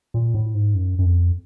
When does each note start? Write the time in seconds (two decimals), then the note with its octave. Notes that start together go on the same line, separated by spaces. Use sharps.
0.14 A#2
0.34 A2
0.54 G#2
0.74 F#2
0.99 F#2
1.05 F2